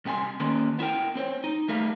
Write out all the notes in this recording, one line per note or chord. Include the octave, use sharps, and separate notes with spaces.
C2 C3 F#5 G#5 C6
D#3 A#3 C#4 B4 C6
B3 E4 A#4 G5
C4 C5 C#5
D#4
G3 A3 A#4 B4 E5 F5